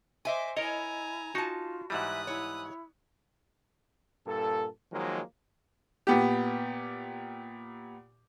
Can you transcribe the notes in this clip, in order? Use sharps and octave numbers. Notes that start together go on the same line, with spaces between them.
C5 D#5 E5 G#5 D6
E4 A#4 C#5 D#5 G#5 A#5
D#4 F4 F#4 A5
G#2 E3 G3 E5 D#6 F#6
E4 C#5
G2 A#2 A4
D#3 F3 F#3 G#3 A#3
A#2 B3 G4